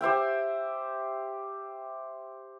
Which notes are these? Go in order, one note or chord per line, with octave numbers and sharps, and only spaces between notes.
G4 C5 E5 G5